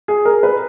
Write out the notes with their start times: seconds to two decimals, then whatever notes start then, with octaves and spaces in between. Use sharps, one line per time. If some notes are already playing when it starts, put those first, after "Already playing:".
0.08 G#4
0.25 A#4
0.43 B4